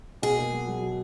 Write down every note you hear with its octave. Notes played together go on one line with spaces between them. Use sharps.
B2 G#4
A#3
F#3
F#3
F#3